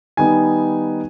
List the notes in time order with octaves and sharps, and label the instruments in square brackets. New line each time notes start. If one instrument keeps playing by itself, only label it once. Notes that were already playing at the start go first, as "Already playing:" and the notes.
[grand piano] D#3 G3 B3 D#4 G#5